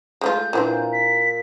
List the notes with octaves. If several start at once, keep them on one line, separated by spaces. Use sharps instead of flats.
G#3 A3 F4 G6
A#2 E3 C4 D4
B6